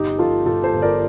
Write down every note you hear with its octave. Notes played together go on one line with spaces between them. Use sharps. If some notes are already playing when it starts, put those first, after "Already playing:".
Already playing: G1 D#4 G4
F3 F4 A4
G1 F4 A4
A4 C5
G1
A#4 D5